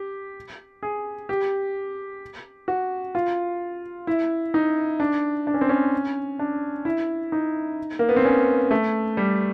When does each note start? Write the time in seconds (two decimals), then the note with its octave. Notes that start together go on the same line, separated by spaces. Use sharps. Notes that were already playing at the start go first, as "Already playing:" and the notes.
Already playing: G4
0.83 G#4
1.29 G4
2.68 F#4
3.15 F4
4.07 E4
4.54 D#4
5.00 D4
5.47 D4
5.54 C#4
5.61 C4
5.69 C#4
6.39 D4
6.85 E4
7.32 D#4
7.99 A#3
8.09 B3
8.16 C4
8.25 C#4
8.71 A3
9.17 G3